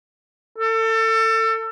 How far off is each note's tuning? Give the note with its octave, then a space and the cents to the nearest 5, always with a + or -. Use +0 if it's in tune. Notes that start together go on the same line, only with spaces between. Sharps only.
A4 +30